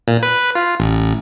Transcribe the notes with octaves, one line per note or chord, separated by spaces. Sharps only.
A#2
B4
F4
A1